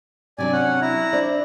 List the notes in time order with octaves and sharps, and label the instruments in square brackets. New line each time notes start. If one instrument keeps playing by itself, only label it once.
[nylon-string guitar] C3 F#3 D4 [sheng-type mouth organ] D5 G#5
[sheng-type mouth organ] C#4 F#5
E4 A#5
[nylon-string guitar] D4 C5 D5